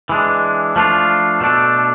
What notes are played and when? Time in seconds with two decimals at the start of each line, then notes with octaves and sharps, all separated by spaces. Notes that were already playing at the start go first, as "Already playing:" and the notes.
0.09 E3 G#3 D4
0.76 F3 A3 D4 F4
1.41 B2 A3 D4 A4